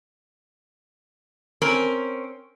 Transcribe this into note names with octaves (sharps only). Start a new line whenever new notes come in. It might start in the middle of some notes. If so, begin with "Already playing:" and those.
C4 C#4 A#4